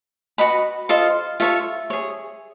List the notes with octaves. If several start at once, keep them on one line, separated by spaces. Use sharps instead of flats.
F#4 B4 D#5 B5
F4 A4 C5 D#5 F5
F4 A4 C#5 E5
G#4 C#5